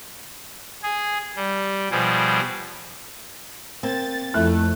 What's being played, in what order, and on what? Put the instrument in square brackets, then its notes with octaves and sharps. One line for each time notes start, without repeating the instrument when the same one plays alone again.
[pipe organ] G#4
G3
B2 F3 G3 G#4
[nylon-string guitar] A#3 C4 [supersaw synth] A6
[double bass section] F2 [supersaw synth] A3 [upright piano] E4 F#6